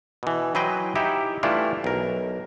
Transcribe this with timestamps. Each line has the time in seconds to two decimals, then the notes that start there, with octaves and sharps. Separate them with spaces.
0.23 B2 E3
0.55 E3 F#3 B4 C5 D#5 G5
0.95 D#4 E4 G4 E5
1.43 E3 G3 A3 D4 E4 F4
1.84 B1 A#4